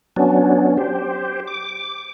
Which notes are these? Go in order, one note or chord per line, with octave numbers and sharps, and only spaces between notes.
F#3 B3 C#4 D4
G4 C5
D6